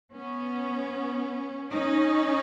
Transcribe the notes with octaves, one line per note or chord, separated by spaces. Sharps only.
B3 C#4
C#4 D#4